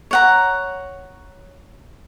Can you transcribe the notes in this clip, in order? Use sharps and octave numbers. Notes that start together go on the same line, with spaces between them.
C#5 F#5 A#5